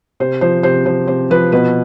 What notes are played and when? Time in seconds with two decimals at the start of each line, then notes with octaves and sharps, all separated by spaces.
0.20 C3 C5
0.41 F3 C5
0.63 C3 C5
0.86 F3 C5
1.08 C3 C5
1.30 F3 B4
1.52 B2 B4